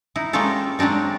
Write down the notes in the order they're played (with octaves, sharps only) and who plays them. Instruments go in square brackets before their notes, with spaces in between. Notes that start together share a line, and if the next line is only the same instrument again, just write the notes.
[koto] D#4 E4
G#3 A#3 C#4 F4 G4 A4
F#3 G#3 C4 D4 D#4